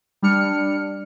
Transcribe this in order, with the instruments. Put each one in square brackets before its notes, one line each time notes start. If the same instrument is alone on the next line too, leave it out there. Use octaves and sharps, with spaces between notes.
[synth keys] G3 D4 F6 C#7